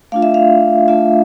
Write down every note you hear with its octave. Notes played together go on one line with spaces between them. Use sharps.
A3 D4 F4 F5
E5
F5
A3 D4 F4 E5